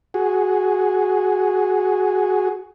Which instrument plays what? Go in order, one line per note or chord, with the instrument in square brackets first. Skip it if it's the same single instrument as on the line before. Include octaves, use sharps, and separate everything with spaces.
[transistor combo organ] F#4 G#4